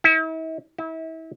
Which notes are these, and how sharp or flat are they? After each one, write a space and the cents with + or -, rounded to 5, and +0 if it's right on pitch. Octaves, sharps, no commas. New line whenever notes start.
E4 -45
E4 -35